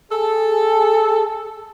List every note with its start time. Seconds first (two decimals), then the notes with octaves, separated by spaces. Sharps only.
0.11 G#4 A4